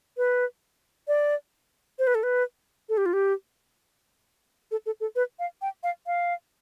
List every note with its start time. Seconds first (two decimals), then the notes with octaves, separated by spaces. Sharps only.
0.17 B4
1.08 D5
1.99 C5
2.07 B4
2.15 A4
2.23 B4
2.89 A4
2.97 G4
3.06 F4
3.13 G4
4.71 A4
4.86 A4
5.00 A4
5.16 B4
5.39 F5
5.62 G5
5.83 F5
6.07 F5